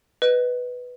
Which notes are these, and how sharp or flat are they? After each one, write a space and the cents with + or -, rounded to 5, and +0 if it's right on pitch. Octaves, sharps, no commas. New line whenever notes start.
B4 +0 D#5 -15